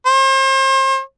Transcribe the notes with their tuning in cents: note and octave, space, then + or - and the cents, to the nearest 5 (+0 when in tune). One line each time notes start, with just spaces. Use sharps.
C5 +35